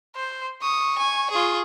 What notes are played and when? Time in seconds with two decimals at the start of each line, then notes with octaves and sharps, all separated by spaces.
0.16 C5
0.62 C#6 D#6
0.98 G#5
1.31 F4 G#4